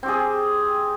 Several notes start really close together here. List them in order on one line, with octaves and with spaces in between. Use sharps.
C4 G4 G#4